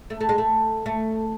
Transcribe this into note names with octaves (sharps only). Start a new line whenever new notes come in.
A3
A3
G#3
A3
A3